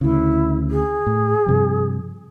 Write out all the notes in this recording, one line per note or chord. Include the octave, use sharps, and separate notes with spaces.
D2 C#3 E4
G#4
A2
G2 C3 F3